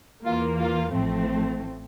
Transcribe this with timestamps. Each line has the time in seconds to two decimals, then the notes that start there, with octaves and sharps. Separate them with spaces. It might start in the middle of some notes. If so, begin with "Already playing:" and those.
0.24 E2 E3 A#3 F4
0.58 F4
0.92 A1 A2 F3 A3 C4